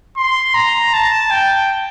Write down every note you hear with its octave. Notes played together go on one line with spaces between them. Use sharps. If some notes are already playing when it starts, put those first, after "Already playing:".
C6
A#5
A5
G5